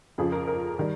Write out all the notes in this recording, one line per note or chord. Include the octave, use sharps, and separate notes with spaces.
F2 C#3 F3 G#4
A#4
A#4
D#3 G3